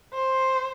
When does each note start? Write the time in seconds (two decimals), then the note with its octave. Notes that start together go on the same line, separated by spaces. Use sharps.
0.14 C5